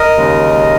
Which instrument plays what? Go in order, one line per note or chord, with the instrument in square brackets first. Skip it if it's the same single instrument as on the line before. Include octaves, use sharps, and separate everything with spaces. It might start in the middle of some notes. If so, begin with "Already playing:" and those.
Already playing: [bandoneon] A#4 D#5
D#2 C#3 G#3